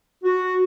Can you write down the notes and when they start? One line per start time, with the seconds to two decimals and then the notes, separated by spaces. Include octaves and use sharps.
0.24 F#4